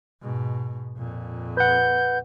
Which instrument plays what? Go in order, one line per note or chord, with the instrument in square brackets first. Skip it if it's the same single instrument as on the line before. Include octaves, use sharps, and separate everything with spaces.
[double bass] G#2 B2
F2 A#2
[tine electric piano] B4 F#5 [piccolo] G6